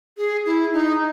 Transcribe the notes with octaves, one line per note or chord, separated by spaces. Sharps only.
G#4
E4
D#4